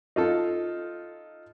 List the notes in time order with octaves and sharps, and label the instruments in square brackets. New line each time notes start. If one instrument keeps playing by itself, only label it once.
[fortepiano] D#4 F4 A4